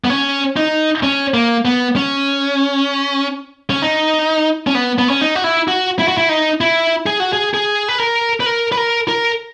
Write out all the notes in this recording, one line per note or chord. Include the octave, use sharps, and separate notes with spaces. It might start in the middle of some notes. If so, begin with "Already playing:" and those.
B3
C#4
D#4
C#4
A#3
B3
C#4
C#4
D#4
C#4
B3
B3
C#4
D#4
F#4
E4
F#4
E4
F#4
E4
D#4
E4
G#4
F#4
G#4
G#4
B4
A#4
B4
A#4
B4
A#4
A#4